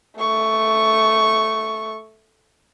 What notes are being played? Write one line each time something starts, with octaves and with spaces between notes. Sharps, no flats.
A3 C#6